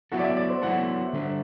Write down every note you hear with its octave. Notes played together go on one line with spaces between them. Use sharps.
F#3 B3 E4 F#4 A4
D5
E5
D5
C5
F#3 B3 E4 A4 F#5
D3 G3 D4 A4